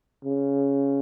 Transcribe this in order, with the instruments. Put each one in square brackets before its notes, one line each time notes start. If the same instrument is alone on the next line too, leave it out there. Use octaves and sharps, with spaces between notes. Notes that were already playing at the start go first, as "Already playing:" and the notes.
[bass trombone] C#3